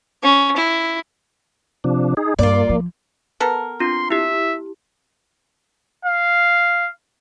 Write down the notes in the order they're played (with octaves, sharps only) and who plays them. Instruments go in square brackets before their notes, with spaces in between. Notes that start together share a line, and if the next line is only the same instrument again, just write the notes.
[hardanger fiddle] C#4
E4
[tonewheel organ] C3 F3 D4
D#4 G#4
[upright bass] G2 [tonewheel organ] A#3 [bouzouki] F4 D5
[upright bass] F3
[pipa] B3 A4 A#4
[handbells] C4 D4 F4 [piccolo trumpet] C6
[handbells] E4 G4 [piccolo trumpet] E5
[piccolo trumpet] F5